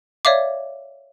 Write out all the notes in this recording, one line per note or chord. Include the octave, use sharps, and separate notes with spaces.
C#5 D5 E5 F5 D6